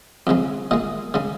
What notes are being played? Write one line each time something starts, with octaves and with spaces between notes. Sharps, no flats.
F2 C#3 G#3
A#2 G#3 D#5
C#3 G#3